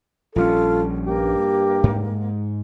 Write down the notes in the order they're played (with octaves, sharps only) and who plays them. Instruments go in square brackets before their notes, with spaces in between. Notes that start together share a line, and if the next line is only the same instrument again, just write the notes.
[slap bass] A#1 G3 C#4 [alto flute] F4 [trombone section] A4
[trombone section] G2 [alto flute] A#3 [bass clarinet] G4
[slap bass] G#2